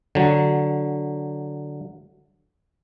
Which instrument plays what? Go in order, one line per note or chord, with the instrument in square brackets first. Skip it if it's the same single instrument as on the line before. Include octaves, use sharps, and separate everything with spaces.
[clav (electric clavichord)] D3 F#3